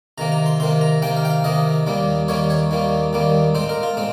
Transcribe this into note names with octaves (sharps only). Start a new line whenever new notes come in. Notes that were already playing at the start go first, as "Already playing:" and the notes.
C3 D#3 A#3 A#5
A#5
C6
C3 D#3 A#3 C6
A#5
C3 D#3 A#3 G5
F5
G5
F5
C3 D#3 A#3 D#5
D#2 D#3 G3 A#3
D#2 D#3 G3 A#3 C#5
C#5
D#2 D#3 G3 A#3
D#2 D#3 G3 A#3
A#2 G#3 C4 C5
A#4
F4
A#2 G#3 C4